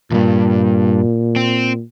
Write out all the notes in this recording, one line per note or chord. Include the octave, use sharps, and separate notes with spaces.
D2 G2 A#2
C4